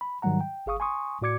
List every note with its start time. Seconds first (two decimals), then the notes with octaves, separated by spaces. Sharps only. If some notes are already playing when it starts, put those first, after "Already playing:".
0.01 B5
0.22 G#2 D#3 F#3 G3 F#5 A#5
0.41 G5
0.66 G1 G#4 F5 C#6 D#6
0.80 G#5 C6 C#6 D#6
1.22 A2 F#4 D5 D6 G#6 C#7